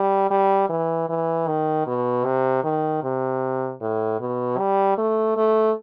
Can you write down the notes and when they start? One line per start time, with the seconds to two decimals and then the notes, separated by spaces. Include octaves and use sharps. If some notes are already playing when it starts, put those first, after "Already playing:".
Already playing: G3
0.30 G3
0.69 E3
1.09 E3
1.47 D#3
1.87 B2
2.25 C3
2.64 D#3
3.03 C3
3.81 A2
4.20 B2
4.58 G3
4.98 A3
5.37 A3